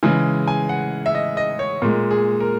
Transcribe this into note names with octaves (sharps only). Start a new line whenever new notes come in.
C#3 E3 G#3 G#5
G#5
F#5
E5
D#5
D#5
C#5
A#2 G#3
G#4
A#4